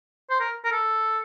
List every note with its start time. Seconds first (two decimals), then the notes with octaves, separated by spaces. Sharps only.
0.30 C5
0.40 A#4
0.65 A#4
0.72 A4